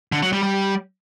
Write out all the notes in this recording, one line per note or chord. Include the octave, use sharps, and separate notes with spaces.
D3
F#3
G3
G3